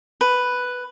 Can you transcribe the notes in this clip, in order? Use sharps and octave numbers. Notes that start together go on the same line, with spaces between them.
B4